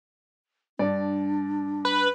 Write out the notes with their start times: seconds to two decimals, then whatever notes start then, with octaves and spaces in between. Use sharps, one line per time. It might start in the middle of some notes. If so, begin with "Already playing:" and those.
0.79 G2 D4 D5
1.85 B4